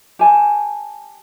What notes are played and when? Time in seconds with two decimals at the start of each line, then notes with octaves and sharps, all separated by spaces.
0.19 G4 G#5 A5